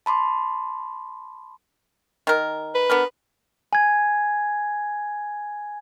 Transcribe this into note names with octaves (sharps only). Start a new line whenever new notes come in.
A5 B5 C6 D6
D#3 A#4
B4
B3 D4 A#4
G#5 G#6